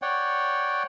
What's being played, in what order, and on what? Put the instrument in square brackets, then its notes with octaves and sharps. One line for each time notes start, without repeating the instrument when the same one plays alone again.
[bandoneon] C#5 D5 F#5 G5